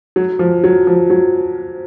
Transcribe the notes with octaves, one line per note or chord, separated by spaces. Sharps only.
F#3
F3
F#3
F3
F#3